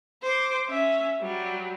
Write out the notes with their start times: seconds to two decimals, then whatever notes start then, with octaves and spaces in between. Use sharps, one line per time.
0.22 C5 D6
0.68 C#4 E5
1.21 F#3 G3